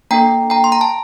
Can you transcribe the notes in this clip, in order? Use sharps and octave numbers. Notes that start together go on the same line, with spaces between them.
A#3 D4 A4 G5 A#5
G5 A#5
C6
A#5
A5